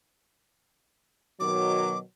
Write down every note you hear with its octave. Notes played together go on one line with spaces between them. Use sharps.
B2 D#3 F#3 D6